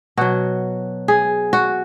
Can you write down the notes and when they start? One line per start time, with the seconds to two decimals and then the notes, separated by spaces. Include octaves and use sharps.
0.17 B2 F#3 F#4
1.08 G#4
1.53 F#4